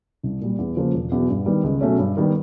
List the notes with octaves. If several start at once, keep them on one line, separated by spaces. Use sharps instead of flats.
C2
A#2 G3
E2
C#3 F3 A#3
E1
E2 B2 F#3
G2
D#3 G3 B3
C#2
B2 F#3 A3 C#4
G2
D#3 G3 B3